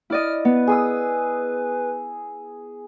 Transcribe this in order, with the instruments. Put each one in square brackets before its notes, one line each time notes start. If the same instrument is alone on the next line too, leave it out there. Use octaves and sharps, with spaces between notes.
[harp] E4 D5 D#5 [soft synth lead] F6
[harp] B3 [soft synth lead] B4
[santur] G#4 D#6 E6